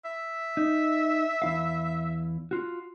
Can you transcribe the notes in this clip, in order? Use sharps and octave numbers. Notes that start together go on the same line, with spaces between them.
E5
D#4
E2 E4 F5
F4 F#4